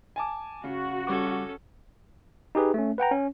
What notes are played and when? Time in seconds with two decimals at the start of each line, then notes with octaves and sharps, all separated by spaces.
0.16 G#5 A5 D6
0.64 C#3 F#4
1.07 G3 C#4 A4 F#5 D6
2.55 D#4 G4 G#4 B4
2.74 A3 C#4
2.98 B4 F#5 G5 A#5
3.11 C#4